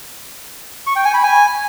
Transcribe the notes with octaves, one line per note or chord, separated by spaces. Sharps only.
C#6
G5
G#5
B5
G#5